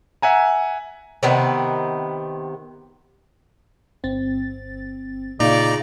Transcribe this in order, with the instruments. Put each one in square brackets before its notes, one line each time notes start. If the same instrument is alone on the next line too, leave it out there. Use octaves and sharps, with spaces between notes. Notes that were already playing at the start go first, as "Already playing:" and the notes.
[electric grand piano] E5 F#5 G#5 A#5
[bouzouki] C3 D#3 B3
[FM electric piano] G1 C4 A6
[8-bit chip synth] A#2 D#4 A#5 [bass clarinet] C#3 [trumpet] D5